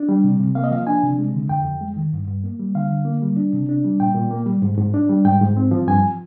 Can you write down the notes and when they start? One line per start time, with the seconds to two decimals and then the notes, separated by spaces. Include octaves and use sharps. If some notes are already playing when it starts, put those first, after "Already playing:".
Already playing: D4
0.09 G3
0.24 C3
0.40 C3
0.55 A#3 F5
0.64 D#5
0.71 F3 F5
0.87 D4 G#5
1.03 C3
1.19 G#3
1.34 D3
1.49 F2 G5
1.65 F2
1.81 G#3
1.96 D#3
2.13 G2
2.28 G2
2.44 A#3
2.59 G3
2.75 D3 F5
2.91 D3
3.05 A#3
3.22 G3
3.36 D4
3.53 C3
3.69 D4
3.85 G3
4.00 A#2 G5
4.15 A#2
4.31 A#3
4.46 G3
4.62 G#2
4.78 G#2
4.94 D4
5.09 G3
5.25 G#2 G5
5.41 G#2
5.57 C4
5.71 F3
5.87 G2 G#5